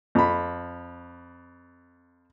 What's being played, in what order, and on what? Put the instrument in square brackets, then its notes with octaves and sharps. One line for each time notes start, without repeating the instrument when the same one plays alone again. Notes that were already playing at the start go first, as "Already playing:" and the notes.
[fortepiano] F2 B5